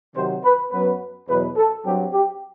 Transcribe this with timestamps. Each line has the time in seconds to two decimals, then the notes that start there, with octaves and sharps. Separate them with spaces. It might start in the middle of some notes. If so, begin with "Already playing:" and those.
0.15 C3 D#3 F#3 C5
0.44 B4
0.71 F#2 F#3 B3 B4
1.28 E2 B2 F#3 B4
1.56 A4
1.85 G2 F#3 C4 G4
2.13 G4